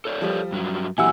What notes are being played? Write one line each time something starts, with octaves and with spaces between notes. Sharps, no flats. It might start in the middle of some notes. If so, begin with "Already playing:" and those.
A4 C#5 D5
F3 G3
G2 F#3
A#2 E3 F#3 E4 G4 F#5 G#5 E6